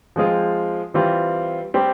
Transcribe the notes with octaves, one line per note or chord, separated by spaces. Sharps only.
F3 G#3 C4 F4 G#4
E3 G3 C4 F4
G3 C4 G4